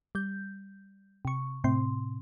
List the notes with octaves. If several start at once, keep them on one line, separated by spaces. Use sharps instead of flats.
G3 G6
C3 C#6
A2 C3 C4 C6